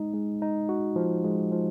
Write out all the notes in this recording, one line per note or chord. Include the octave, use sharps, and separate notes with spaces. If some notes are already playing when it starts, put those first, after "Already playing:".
Already playing: G#3 D#4
G#3
D#4
F#4
F3
G#3
F3